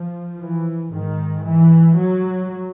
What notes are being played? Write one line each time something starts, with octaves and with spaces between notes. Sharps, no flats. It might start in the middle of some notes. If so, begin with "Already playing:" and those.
Already playing: F3
E3
G#2 D#3
E3
F#3